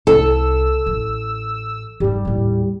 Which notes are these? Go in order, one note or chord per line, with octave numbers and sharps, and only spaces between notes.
C2 A4 E6
A1
G#2 G3 D#4
D#2 A2